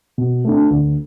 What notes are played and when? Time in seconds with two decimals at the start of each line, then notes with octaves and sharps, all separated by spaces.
0.18 B2
0.44 A3 D4
0.70 D2